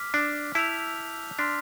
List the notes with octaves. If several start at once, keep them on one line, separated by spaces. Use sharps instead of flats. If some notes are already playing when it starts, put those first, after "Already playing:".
Already playing: D6 F6 B6
D4
E4 A5 E6 G6 B6 F7
D4 C6 F6 B6